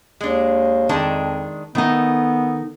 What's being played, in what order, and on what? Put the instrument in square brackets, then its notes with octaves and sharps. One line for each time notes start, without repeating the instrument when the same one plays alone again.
[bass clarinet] D#2 [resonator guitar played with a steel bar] G#3 D4
[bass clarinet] F2 [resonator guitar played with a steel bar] D#3 G#3 D4 [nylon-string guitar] A5
[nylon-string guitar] D#3 D#4 [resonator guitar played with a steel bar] A3 [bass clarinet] B3